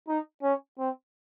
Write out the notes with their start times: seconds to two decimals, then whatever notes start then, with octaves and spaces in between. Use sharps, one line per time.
0.08 D#4
0.43 C#4
0.79 C4